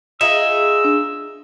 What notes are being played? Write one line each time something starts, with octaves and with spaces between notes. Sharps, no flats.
D#4 F4 G#4 E5 E6
D4